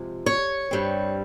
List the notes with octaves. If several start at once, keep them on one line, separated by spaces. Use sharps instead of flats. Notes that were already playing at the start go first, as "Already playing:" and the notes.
Already playing: C3 F3 G#3
C#5
G2 G3 C4